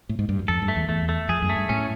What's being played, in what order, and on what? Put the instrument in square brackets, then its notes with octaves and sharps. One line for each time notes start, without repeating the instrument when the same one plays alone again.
[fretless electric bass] A2
G#2
G2
F#2
[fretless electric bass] F2 [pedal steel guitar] A4
[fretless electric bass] G2
[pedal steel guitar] A3
[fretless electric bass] E2
[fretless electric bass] E2 [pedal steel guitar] A3
[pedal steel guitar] A3
[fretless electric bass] F2 [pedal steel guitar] G#4
[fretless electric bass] F#2
[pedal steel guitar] A3
[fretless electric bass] G2
[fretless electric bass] A2 [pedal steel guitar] C#4